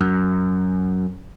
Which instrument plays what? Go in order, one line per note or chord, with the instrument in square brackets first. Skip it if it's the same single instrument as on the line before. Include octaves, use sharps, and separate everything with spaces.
[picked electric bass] F#2